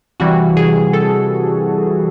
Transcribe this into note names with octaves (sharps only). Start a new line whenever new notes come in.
C3 E3 G3 F#4
G#4
A4